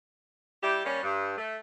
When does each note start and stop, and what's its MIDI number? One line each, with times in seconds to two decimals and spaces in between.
0.63 0.82 55
0.63 0.82 64
0.63 0.82 67
0.85 1.01 55
0.85 1.01 58
0.85 1.01 61
1.03 1.35 43
1.38 1.56 57